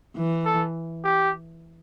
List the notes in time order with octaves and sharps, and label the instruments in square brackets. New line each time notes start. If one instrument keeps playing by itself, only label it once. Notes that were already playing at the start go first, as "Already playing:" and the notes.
[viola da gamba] E3
[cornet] A4
G4